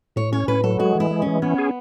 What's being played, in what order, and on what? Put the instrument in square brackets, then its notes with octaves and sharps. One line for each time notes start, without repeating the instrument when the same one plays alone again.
[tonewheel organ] A2 [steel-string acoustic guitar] C#5
[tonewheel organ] C#4 [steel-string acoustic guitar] C#5
[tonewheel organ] A2 [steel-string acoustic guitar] B4
[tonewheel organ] F#3 [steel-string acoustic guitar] A4
[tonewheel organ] G#3 [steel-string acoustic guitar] F#4
[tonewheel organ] E3 [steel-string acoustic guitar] E4
[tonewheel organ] G#3
[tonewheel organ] E3 [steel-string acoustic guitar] C#4
[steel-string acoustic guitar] B3 [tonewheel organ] C#4
[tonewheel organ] G#4